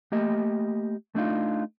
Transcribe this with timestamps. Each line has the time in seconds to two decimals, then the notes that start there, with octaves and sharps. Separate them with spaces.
0.12 A3 A#3 G4 D#5
1.15 A3 D4 D#4 F4